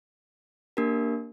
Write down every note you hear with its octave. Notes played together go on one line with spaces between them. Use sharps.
A#3 D4 G4 A#4